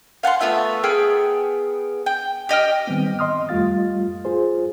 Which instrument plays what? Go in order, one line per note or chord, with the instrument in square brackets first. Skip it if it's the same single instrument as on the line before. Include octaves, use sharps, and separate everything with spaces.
[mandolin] F5 F#5 A5 C6
A3 B3 F4 E5
B3 G#4 G5 F6
G5
G4 D#5 G5 F6
[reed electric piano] D#3 G3 B3 C4
D#5 C6 D#6 F6
F2 G3 A3 F4 F5 A6
F4 G#4 C5